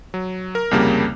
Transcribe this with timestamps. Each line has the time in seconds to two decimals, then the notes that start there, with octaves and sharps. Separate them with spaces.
0.14 F#3
0.55 A#4
0.71 C2 F2 C#3 G3 A#3